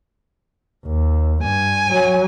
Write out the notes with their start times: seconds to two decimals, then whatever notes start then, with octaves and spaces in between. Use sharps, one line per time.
0.86 D#2
1.43 G2 G#5
1.89 F#3